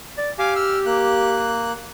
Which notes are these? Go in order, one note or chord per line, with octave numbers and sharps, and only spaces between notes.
D5
G4 F5 G#5 D6
E6 F6
A#3 F#6